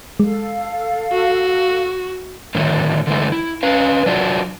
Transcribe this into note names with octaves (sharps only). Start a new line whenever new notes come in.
G#3 A4 F5
F#4
A2 D3 D#3 F#3 A3
D3 E3 G#3 A3
E4
C#4 B4 F5
F#3 D4 F4 F#4